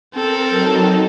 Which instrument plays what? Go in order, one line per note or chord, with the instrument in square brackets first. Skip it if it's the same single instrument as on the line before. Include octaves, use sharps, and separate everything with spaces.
[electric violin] C4 A4 [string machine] A#4
[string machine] F#3 D#4